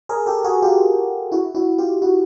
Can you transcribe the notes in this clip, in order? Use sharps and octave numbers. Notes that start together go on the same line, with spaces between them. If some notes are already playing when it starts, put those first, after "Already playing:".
G#4 A#4
G4 A4
F#4 G#4
F4 G4
E4 F#4
E4 F#4
F4 G4
E4 F#4